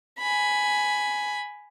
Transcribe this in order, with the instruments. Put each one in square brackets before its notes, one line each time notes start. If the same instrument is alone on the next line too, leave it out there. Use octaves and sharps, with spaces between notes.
[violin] G#5 B5